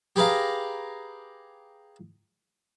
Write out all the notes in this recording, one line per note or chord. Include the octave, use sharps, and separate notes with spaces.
G4 G#4 B4 F5 A#5